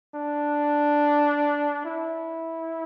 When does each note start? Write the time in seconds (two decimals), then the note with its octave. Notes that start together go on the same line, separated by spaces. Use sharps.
0.15 D4
1.85 E4